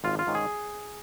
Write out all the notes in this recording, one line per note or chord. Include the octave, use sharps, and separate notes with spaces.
G#1 F4
F4
G#2 D#3 C#4
G#4